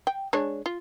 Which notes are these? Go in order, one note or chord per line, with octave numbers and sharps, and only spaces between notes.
G5
G#3 D4 C#5
F4